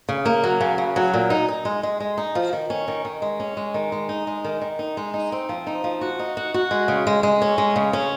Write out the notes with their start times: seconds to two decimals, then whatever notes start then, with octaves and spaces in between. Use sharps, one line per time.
0.09 C#3
0.26 A#3
0.44 F#3
0.61 C#3
0.78 C#3
0.96 F#3
1.14 A#2
1.30 D#4
1.48 D#4
1.65 G#3
1.83 G#3
2.00 G#3
2.18 D#4
2.35 F3
2.53 D#3
2.70 C#4
2.88 D#3
3.05 D#3
3.22 G#3
3.40 C#4
3.57 G#3
3.74 D#3
3.92 G#3
4.09 D#4
4.27 G#3
4.45 D#3
4.62 D#3
4.79 D#4
4.97 G#3
5.14 D#4
5.32 C4
5.49 F3
5.67 D#4
5.84 F3
6.01 F#4
6.19 D#4
6.37 F#4
6.54 F#4
6.71 G#3
6.88 C#3
7.07 G#3
7.23 G#3
7.42 C#4
7.58 G#3
7.76 C#3
7.93 C#4